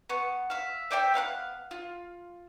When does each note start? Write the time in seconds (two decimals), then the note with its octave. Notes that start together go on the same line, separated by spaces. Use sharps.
0.09 B3 C#6
0.50 E5 F5
0.91 C5 D5 E5 G5
1.14 B3 F5 C6 F#6
1.71 F4